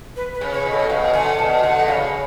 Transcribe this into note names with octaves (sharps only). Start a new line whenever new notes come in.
B4
B4
C#3
C#5
B2
A4
C#3
B2 F5
D3 G#5
B2 A5
D3 F#5
B2
C#3 F5